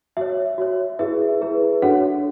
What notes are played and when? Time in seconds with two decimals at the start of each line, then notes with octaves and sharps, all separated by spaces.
0.17 F#4 C#5 E5
0.58 F#4 C#5
0.99 E4 G#4 B4 E5
1.41 E4 G#4 B4
1.82 D4 F#4 A4 C#5 F#5